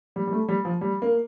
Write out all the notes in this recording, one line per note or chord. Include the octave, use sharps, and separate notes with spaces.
G3
G3
A3
G3
F3
G3
A#3